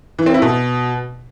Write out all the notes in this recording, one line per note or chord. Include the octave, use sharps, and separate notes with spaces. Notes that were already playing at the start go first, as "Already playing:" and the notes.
E3
C4
E4
B2